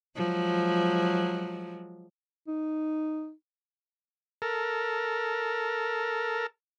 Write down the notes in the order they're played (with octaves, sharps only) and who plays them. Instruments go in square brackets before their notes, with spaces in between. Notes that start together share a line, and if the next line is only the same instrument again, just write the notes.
[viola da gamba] F3 F#3 G#3
[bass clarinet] D#4
[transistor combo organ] A4 A#4